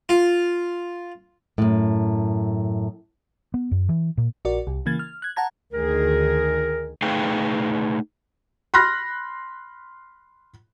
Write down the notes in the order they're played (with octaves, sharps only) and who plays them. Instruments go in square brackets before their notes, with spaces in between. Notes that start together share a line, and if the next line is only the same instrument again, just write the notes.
[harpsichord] F4
[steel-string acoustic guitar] F#2 A2
[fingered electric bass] B3
F#2
E3
A#2
[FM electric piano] A#1 F#4 A#4 D5
C2
C#3 E3 A#3 G#6 A6
F6
F#6 G#6
F#5 A5 A#5 G#6
[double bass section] D2 [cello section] D#3 G#4 [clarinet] A#4
[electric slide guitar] A3 D#4 G#4 B4 F5 G5
[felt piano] B5 C6 F6 F#6 A#6